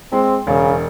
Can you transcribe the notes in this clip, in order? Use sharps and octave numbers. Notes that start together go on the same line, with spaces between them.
G#3 C4
E1 C#3